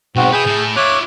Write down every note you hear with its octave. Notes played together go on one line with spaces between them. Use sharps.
B1 G#2 C4 F#4
G#4 B4 E5 G6
A2 E4
F4 C#5 E5 D6 F#6